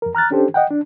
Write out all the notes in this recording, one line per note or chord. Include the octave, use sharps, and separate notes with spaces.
F2 A#4
A#5 F6 F#6 A6
C#4 D4 G4 A4 C5
D#5 F#5 G5
D4